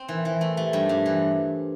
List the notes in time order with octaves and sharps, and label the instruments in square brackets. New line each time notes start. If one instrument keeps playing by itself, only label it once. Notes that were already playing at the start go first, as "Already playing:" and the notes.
Already playing: [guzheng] C4
[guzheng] E3 [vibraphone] A#4 C5
[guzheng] E3 [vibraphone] A#4 C5
[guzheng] A3 [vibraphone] A4 B4
[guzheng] A3 [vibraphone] G4 A4
[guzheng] G2
G2
E3